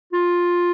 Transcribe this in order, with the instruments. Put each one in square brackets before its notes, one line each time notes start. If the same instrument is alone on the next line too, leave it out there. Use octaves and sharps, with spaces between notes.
[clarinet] F4